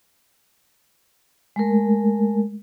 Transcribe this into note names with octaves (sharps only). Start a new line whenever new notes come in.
G#3 A3 A#4